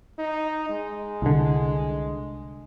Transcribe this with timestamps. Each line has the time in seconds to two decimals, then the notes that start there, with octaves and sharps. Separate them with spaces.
0.19 D#4
0.70 G#3
1.22 C2 D3